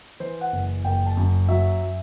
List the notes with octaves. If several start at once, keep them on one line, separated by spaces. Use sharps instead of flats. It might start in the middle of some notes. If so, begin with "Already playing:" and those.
E3 C5
F#5
F#1
F#1 G5
A5
F#2
F#3 E5